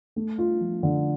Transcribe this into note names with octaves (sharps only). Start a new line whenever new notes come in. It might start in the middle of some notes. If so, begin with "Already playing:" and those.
A3
F4
F3
D3